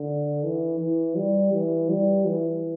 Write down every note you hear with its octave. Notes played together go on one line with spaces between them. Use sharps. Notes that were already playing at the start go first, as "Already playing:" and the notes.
Already playing: D3
E3
E3
G3
E3
G3
E3